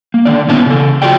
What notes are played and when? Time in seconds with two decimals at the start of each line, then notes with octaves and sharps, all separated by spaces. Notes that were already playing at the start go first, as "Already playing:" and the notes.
0.14 A#3
0.25 D3 D#3 D4 D5
0.48 A#2 B3 C#4 E4 A5
0.66 C#3 A4
1.02 F4 F#4 G#4 D5 G5